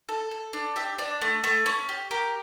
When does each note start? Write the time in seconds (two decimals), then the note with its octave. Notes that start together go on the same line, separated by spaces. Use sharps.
0.09 A4
0.31 A4
0.53 D4
0.76 G4 E5
0.98 D4 D5
1.21 A3
1.44 A3
1.66 C#4
1.89 G4
2.11 G4 A#4